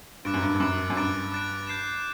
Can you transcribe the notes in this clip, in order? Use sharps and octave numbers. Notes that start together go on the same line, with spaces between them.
G2 D6 F#6 A6 D7
F#2
G2
G2
F#2 D6 F#6 A6 D7
F#2
G2 D6 F#6 A6 D7
D6 F#6 A6 D7
G6 C7 E7